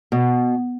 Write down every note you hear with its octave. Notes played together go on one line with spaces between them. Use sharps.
B2